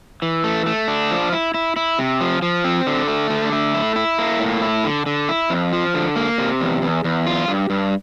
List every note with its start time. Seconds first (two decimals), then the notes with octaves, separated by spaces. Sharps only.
0.22 E3
0.44 A3
0.66 A3
0.88 D4
1.11 F3
1.32 E4
1.54 E4
1.76 E4
1.99 C3
2.21 F3
2.42 F3
2.64 C4
2.87 D3
3.08 A3
3.30 D3
3.52 A3
3.74 E4
3.96 E4
4.19 A#3
4.40 A2
4.62 E4
4.84 D3
5.06 D3
5.29 E4
5.50 F2
5.73 F3
5.94 D3
6.16 A#3
6.38 C3
6.60 E2
6.82 E2
7.04 E2
7.27 F4
7.48 G2
7.70 G2